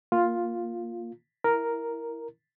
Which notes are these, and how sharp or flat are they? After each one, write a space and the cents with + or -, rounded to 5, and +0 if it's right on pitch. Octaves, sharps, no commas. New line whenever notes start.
A#3 +0 F4 +5
E4 +0 A#4 +0